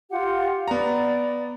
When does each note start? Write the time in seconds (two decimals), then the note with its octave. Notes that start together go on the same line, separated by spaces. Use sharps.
0.10 F4 G4 F#5
0.68 B3 D5 A#5